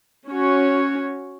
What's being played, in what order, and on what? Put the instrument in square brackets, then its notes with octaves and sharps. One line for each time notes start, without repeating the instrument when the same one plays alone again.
[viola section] C#4 F#4 C#5